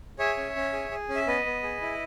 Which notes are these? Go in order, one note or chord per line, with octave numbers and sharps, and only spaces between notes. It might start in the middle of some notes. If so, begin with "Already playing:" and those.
G#4 C#5 E5
C#4
C#4
G#4
G#4
C#4
E5
B3 B4 D#5
B3
G#4
E4